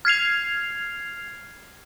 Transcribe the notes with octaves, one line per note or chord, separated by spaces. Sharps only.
F6 G#6 C7 F7